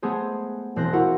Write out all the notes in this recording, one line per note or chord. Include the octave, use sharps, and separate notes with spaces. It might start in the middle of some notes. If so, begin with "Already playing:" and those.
G#3 A3 B3 G#4 C5
E1 C4 C5 F#6 A#6
E4 F#4 A#4 F5 F#5